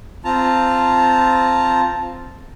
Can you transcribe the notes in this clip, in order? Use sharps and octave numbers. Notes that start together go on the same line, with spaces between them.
C4 F4 A5 A#5